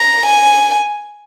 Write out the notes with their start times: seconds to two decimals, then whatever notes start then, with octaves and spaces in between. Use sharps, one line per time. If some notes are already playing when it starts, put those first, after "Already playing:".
Already playing: A#5
0.26 G#5